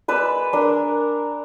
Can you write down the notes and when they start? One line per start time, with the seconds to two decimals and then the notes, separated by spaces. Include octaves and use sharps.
0.08 G#3 B4 D5 E6
0.53 D4 A#4